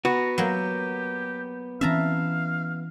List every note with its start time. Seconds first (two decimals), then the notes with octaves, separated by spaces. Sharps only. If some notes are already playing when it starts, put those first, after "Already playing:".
0.05 B3 F#4 A#5
0.38 F#3 A#3 G4
1.81 E3 C4 C#4 E5 F5 A5 A#5